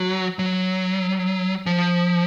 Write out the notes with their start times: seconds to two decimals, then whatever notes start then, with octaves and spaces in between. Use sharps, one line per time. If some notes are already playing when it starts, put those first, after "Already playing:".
Already playing: F#3
0.39 F#3
1.66 F3